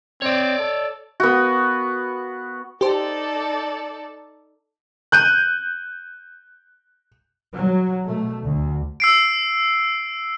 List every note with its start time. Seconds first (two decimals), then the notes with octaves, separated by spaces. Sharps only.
0.22 C4 C#5 D5
0.59 A4
1.20 B3 F#4
2.81 D#4 G4 A4 C5 D5
5.12 F#6 G6 D#7
7.55 F#3
8.05 B2 A3
8.41 D2
9.00 E6 C7 D7